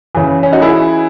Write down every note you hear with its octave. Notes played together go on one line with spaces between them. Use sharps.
C#3 E3
C#4
D#4 F#4
E4 G#4